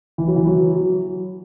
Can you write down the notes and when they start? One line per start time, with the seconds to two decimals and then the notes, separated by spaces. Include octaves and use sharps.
0.18 E3
0.28 F#3
0.36 E3
0.47 F#3
0.75 F#3